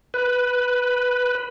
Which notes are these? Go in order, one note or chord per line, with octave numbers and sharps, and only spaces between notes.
B4